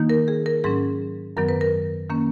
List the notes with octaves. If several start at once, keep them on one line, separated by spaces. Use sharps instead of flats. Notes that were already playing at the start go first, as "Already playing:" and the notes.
Already playing: D#3 A#3 D#4
A#4
G#4
A#4
G#2 F#3 C#4 G#4
F#2 D#3 F#3 B3 A#4
B4
A#4
D#3 A#3 C#4